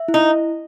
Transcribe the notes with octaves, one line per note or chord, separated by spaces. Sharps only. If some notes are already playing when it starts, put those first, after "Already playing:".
Already playing: E5
E4
D#4